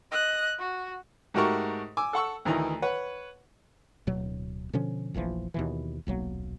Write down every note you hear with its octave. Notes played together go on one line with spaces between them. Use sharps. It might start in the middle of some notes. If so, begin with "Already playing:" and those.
D#5 F#6
F#4
G#2 A3 F#4 G4 A#4 C#6
G#5 D6 E6
A4 F#5 C#6 E6
D2 D#3 E3 A#5
B4 C#5 F#5
D1 B2 F#3
B2 D3 F3 C#4
F1 A#1 E3 F3
D#2 B2 E3
D#1 B1 F#3 A#3